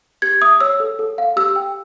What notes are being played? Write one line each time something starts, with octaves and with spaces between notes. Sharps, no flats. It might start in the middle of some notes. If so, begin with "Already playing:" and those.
G4 G#6
E5 D#6
C#5 E6
A4
A4
F5
G4 E6
G5